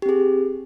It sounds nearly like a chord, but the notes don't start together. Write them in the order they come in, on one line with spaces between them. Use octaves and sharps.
G4 C4 G#4